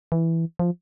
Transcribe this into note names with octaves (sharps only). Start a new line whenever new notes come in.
E3
F3